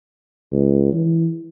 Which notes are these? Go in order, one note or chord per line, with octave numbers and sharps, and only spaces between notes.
C#2
E3